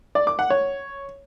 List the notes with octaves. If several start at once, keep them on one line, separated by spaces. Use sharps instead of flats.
D5
D6
F#5
C#5